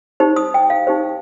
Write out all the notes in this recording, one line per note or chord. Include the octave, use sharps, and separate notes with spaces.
D#4 G4 C5
D#6
G5
F5
D#4 G4 C5